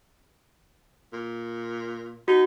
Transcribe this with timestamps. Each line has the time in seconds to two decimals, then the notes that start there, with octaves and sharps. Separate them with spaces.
1.13 A#2
2.28 D#4 F#4